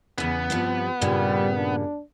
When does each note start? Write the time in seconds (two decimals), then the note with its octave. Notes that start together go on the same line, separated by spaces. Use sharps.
0.18 E2 C#3 B3
0.50 G2 C3 F3
1.01 G2 A#2 C#3 G3
1.57 D4